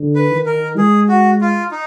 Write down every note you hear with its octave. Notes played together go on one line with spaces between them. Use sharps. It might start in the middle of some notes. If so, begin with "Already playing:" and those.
Already playing: D3
B4
D#3
A#4
G#3 G#4
F#4
F4
D#4